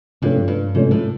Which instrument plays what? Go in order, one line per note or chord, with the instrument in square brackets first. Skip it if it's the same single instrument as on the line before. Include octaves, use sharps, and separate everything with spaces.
[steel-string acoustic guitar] G2 [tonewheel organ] C3 F3 A3 C#4
[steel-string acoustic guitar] G2
[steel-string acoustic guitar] G#2 [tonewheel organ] C3 F3 A3 C#4
[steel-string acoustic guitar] A2